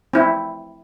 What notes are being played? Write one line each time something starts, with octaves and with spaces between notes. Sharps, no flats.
C4 E4